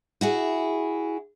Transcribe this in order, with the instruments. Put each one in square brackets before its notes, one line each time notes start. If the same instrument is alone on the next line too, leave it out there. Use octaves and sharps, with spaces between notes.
[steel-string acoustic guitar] E4 F#4 G#4